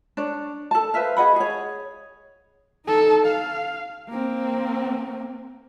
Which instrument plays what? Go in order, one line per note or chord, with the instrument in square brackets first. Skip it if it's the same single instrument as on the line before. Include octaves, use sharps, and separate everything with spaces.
[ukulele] D4 C#5
A4 A5
B4 C5 E5 F5
G#4 D#5 F#5 B5
G#4 C#5
[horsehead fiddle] D#4 A4
F5
A#3 C4